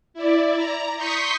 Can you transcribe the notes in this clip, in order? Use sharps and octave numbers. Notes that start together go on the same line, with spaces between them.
E4 D5
A#5
C6 C#6 D#6 G6 B6 C#7